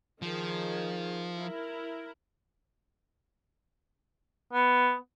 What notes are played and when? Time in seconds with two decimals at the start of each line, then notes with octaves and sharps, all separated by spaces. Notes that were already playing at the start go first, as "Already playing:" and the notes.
0.22 D#3 F3 G#4
1.34 E4 A#4
4.53 B3